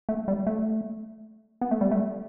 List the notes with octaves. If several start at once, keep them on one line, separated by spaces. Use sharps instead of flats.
A3
G3
A3
B3
A3
G3
A3